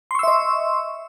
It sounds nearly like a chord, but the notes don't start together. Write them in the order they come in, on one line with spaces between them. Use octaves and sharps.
C6 C#6 E6 E5 D#5